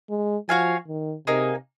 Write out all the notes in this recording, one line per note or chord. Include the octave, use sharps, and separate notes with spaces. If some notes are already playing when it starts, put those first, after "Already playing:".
G#3
F3 F#4 C#5 F5 G#5
D#3
C3 A#3 D#4 G#4